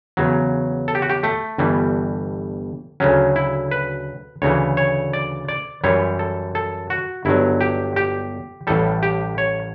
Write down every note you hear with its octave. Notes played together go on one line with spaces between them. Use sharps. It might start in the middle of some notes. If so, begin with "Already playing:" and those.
E2 C#3 F#3
A4
G4
F#4
G4
A3
G1 G2 E3 G3
D2 C#3 F#3 C#4
E4
B4
D2 C#3 E3 C#5
C#5
D5
D5
F#2 E3 G3 C#5
A4
A4
F#4
G1 G2 F#3 E4
G4
G4
A1 A2 G3 A4
G4
C#5